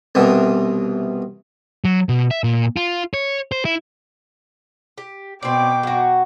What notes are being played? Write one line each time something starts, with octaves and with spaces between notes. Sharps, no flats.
C2 B2 E3
F#3
B2
E5
A#2
F4
C#5
C5
E4
G4
B2 C4 D5 G5 D6
F#3 F#4